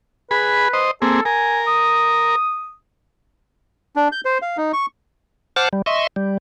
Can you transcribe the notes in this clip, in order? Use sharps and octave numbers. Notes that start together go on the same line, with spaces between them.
G#4 B4 B5
C5 D#5
A#3 C4 G#4 A4
A#4 G#5
D#6
D4
G6
C5
F5
D#4
C#6
C5 F#5 A5 D6 F6
G3
D#5 E5 C6 C#6
G3